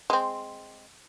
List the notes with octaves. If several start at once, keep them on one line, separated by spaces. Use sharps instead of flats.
G#3 C4